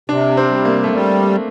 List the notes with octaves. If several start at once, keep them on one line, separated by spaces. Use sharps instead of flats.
C3 D4
C4
G3
A#3
A3
G3 A#3